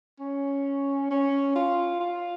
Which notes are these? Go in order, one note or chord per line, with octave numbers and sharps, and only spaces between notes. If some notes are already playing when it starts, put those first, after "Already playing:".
C#4
C#4
F4
F4